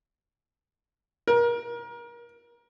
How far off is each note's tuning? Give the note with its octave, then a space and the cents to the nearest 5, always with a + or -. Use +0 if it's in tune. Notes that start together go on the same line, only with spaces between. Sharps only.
A#4 +30